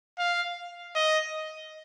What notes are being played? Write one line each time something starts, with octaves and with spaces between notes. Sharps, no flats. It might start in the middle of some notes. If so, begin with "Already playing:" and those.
F5
D#5